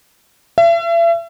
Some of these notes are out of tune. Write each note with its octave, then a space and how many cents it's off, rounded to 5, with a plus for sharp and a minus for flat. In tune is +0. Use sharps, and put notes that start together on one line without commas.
E5 +40